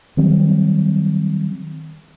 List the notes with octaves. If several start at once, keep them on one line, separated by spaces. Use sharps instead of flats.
D#3 F#3 G3 C4